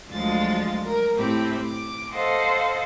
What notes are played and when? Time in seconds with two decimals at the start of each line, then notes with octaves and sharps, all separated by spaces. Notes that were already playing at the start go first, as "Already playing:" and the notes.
0.10 D2 F3 F#3 G#3 F4 A6
0.84 A#4
1.16 A2 C4 G4 B5
1.65 D6
2.12 A4 C5 D#5 F5 F#5